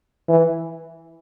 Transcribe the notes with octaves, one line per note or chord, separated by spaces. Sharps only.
E3